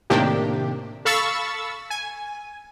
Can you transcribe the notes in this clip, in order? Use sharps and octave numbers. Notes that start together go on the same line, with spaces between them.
A2 C3 D#3 A#3 D4 G4
A4 F5 B5 C#6 E6 A6
G#5